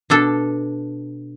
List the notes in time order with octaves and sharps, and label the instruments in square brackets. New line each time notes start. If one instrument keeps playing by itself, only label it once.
[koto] B2 D4 A4